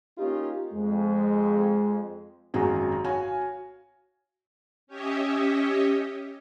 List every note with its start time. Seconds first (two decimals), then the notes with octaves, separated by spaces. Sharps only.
0.18 A#3 C#4 D#4 F4 G4
0.73 F2 G#3
2.54 G#1 F#2 F#3 F#4 G#4 A#5
3.04 F#4 C#5 F5 G#5
4.87 C#4 G4 C#5 D#5 E5